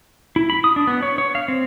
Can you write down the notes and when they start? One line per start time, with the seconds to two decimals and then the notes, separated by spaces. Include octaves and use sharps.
0.36 E4
0.50 B5
0.64 D#6
0.76 D4
0.87 B3
1.03 C#5
1.18 C#5
1.35 F5
1.48 C4